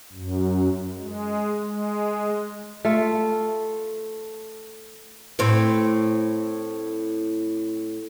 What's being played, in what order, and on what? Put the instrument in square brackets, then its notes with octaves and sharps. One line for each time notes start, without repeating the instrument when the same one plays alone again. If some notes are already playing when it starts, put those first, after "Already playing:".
[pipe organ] F#2
G#3
G#3
[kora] A3 F4
[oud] A2 C4